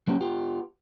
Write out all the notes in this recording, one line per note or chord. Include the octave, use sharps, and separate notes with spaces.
F#3 A#3 B3 C#4 G4
B3 F4 G4